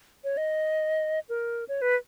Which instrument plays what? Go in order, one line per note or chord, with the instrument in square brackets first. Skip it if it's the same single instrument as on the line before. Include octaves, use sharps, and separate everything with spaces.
[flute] C#5
D#5
A#4
C#5
B4